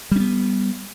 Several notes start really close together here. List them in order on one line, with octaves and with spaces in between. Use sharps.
G3 C#4 B3